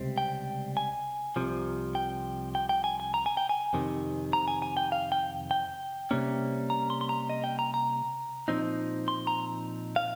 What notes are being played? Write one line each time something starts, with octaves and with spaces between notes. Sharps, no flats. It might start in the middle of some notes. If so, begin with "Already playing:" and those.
Already playing: C#2 C3 G3 C4
G5
G#5
C2 C3 F3
G5
G5
G5
G#5
G#5
A#5
G#5
G5
G#5
F2 C3 D#3
A#5
G#5
G#5
G5
F5
G5
G5
C3 G3 A#3 C#4
A#5
C6
C6
A#5
D#5
G5
A#5
A#5
A#2 F3 C4 D#4
C6
A#5
F5